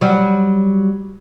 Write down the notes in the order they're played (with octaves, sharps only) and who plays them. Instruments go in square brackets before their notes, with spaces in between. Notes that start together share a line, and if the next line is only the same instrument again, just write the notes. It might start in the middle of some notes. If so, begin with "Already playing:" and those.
[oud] F#3 G3